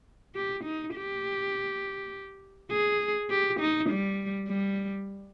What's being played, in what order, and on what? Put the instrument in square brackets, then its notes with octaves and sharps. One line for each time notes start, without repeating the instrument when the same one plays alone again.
[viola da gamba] G4
D#4
G4
G#4
G4
D#4
G3
G3